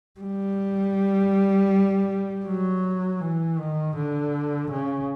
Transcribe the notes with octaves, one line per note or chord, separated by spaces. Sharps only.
G3
F#3
E3
D#3
D3
C#3